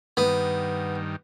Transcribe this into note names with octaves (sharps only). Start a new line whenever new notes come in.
G2 D#3 B3